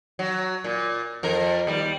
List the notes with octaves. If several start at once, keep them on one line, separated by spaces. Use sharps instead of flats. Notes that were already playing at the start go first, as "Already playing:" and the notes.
F#3
A#2
F2 A#4
D#2 G3